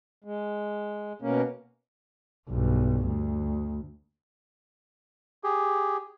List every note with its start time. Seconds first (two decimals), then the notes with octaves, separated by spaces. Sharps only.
0.24 G#3
1.22 B2 A#3 C#4
2.49 B1 G2
3.06 D2
5.44 G4 G#4